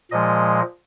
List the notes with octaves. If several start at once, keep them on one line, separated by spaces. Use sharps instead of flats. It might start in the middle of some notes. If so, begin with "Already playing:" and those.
A#2 F3 G#3 D#5